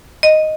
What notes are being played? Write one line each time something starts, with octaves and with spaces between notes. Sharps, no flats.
D#5